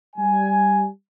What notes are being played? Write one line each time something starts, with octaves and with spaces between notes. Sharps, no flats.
G3 G#5